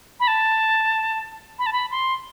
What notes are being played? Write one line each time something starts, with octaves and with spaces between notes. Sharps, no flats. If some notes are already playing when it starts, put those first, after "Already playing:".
B5
A5
B5
A5
B5
C6